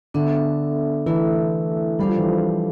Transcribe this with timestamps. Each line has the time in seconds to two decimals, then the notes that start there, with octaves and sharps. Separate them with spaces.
0.14 D3 B3 D4 A4 E5
1.06 E3 A3 E4 A4 E5
1.99 G3 D4 A4 C5 F5
2.09 F3
2.18 E3
2.27 F3